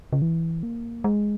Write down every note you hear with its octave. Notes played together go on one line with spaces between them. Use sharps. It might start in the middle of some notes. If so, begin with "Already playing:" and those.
C#3
E3
A#3
G#3